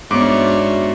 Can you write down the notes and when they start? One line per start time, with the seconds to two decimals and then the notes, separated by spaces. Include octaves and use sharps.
0.11 G#2 B3 C#4 D4 F#4 C#5 E5 D6